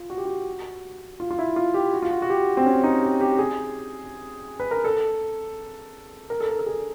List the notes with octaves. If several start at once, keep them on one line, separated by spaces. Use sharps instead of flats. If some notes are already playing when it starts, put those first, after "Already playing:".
Already playing: F4
F#4
G4
F#4
F4
F4
E4
F4
G4
F#4
F4
F#4
F#4
G4
C4
C#4
D#4
G4
G4
G#4
B4
A#4
A4
A#4
A4
A#4
A4
G#4